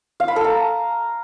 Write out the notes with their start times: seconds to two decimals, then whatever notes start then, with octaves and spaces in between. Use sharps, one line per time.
0.20 F5
0.28 B5
0.36 A4
0.44 A#5